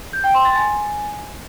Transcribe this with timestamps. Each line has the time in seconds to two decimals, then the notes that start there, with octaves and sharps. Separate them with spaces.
0.13 G6
0.24 G5
0.34 C6
0.45 A6
0.56 G#5